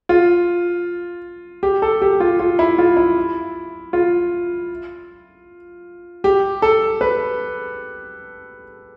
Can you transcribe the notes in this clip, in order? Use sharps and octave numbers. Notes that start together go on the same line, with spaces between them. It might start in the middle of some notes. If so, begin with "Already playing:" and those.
F4
G4
A4
G4
F4
F4
E4
F4
E4
F4
G4
A4
B4